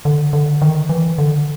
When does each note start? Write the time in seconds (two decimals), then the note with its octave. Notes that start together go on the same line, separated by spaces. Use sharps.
0.05 D3
0.33 D3
0.62 D#3
0.89 E3
1.18 D3